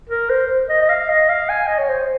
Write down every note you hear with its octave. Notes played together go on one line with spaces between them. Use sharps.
A#4
C5
D#5
D#5
F5
D#5
F5
G#5
D#5
C#5
C5